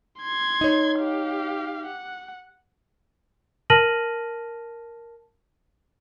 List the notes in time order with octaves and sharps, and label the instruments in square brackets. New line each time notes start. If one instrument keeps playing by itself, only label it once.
[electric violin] C6 G#6
[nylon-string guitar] D#4 C#5
[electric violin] G4 F5
F#5
[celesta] A#4 A5 F6 A#6 D#7 F#7